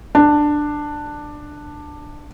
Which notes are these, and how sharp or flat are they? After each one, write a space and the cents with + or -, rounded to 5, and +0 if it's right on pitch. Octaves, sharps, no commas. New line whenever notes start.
D4 +10